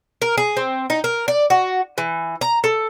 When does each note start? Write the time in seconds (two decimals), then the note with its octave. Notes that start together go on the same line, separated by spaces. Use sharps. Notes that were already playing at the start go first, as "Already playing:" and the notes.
0.22 A#4
0.38 G#4
0.57 C4
0.90 D#4
1.04 A#4
1.28 D5
1.50 F#4
1.98 E3
2.41 A#5
2.64 A4